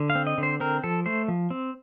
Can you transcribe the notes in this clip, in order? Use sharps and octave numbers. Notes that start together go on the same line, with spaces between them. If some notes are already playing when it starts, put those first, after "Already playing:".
Already playing: D3
F5
C4
D#5
D3 C5
C4 A#4
F3 A4
A3 C5
F3
C4